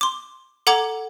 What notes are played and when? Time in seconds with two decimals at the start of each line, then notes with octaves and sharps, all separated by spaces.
0.01 C6 D6
0.67 A4 F#5 A#5 D6 G#6